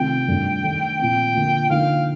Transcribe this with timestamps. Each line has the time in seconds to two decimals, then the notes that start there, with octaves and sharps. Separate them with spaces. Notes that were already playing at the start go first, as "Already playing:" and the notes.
Already playing: C3 D#3 A3 C4 F4 G5
0.28 G2 D#3 A3 D4
0.63 D#3 A3 D4
0.99 A#2 F3 C4 G5
1.35 D3 F3 A#3 F4
1.70 D3 F3 A#3 D#4 F5